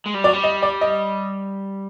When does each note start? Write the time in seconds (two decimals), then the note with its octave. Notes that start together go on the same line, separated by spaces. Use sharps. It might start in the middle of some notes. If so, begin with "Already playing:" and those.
0.06 G#3
0.15 G3
0.24 F#3 D5
0.33 G3
0.44 D#5
0.62 D5
0.81 D#5